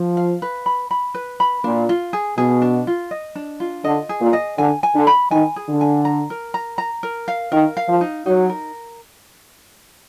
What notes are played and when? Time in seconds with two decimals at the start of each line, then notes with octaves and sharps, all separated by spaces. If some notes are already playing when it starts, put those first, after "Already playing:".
Already playing: F3
0.17 F5
0.42 B4
0.66 B5
0.91 B5
1.14 B4
1.40 B5
1.64 A#2 D4
1.89 F4
2.13 G#4
2.37 B2 G#4
2.62 D4
2.87 F4
3.11 D#5
3.35 D4
3.60 F4
3.84 D3 D#5
4.09 G#4
4.21 A#2
4.33 D#5
4.58 D3 G#5
4.83 G#5
4.95 D3
5.07 B5
5.31 D#3 G#5
5.56 G#4
5.69 D3
5.81 G#5
6.05 A#5
6.30 A#4
6.54 A#5
6.78 A#5
7.03 A#4
7.28 F5
7.52 D#3 A#4
7.77 F5
7.89 F3
8.01 D#4
8.26 F#3 D#4
8.50 A#4